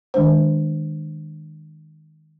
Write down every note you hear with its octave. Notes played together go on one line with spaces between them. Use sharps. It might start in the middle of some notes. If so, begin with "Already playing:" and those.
D#3 G#3 D4 C5